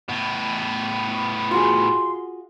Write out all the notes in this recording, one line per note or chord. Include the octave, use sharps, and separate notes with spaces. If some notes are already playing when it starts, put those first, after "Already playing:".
A2 B3
F4 F#4 G#4 C6